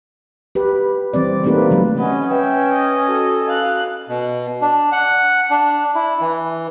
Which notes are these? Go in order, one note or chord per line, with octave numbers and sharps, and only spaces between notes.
G4 B4
E3 G3 C4 D5
A3 A#3 C4 D#4 G4 B4
D3 F#3 G#3 C4
C#4 B4 D#5 F#5 G#6
B4 E5 G5
D#5
F#4 A4
F5 F#6
B2
D4
F#5
D4
E4
E3